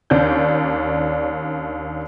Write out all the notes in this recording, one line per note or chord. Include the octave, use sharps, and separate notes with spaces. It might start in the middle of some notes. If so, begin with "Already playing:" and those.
D#2 C#4 D4 D5 G6